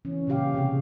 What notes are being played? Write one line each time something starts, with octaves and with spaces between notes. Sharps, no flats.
E3 C#4
A#2 C#3 C#4 G4 F5
C3 G4 G#4